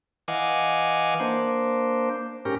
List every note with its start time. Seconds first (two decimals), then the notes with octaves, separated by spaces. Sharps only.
0.28 E3 D#5 F5 F#5 G#5 D6
1.20 A#3 D4 C5
2.45 G#2 C#4 G4 A#4